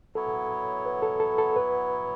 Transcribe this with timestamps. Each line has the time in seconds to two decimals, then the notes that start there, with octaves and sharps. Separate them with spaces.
0.15 F#3 B3 E4 A4 C#5
0.86 B4
1.02 A4
1.20 A4
1.38 A4
1.56 B4